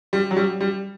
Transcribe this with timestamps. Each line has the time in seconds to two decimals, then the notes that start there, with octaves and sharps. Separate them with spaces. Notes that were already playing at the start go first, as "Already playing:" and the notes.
0.13 G3
0.31 F#3
0.36 G3
0.61 G3